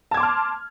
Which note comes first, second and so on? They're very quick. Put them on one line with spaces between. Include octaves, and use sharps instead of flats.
A5 G#6 D6 C6 F6